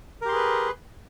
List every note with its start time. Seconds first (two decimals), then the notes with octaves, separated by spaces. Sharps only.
0.22 A#4
0.25 G4
0.29 C6
0.32 G#4
0.36 B4